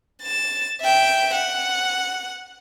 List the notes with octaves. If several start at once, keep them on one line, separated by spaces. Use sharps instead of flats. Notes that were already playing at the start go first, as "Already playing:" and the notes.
A6 E7
E5 G5
F#5